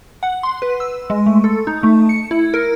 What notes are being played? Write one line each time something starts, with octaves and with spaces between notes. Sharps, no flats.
F#5
C6
B4
E6
G#3
A3
A4
D#4
A3
C#7
E4
A#4